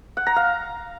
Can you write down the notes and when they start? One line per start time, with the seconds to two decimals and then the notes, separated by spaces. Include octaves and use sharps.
0.17 F#5
0.27 A#5
0.36 F5